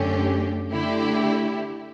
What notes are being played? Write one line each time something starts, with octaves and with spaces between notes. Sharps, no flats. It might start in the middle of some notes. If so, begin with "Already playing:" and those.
Already playing: F#2 D3 A3 C#4 G4
D3 A3 E4 G4